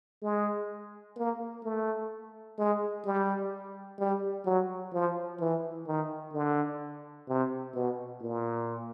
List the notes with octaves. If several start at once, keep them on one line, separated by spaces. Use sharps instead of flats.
G#3
A#3
A3
G#3
G3
G3
F#3
F3
E3
D#3
D3
C3
B2
A#2